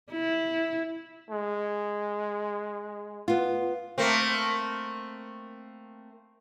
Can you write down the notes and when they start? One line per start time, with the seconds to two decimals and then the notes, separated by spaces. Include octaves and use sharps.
0.12 E4
1.31 G#3
3.28 B3 F4
3.98 A3 A#3 C4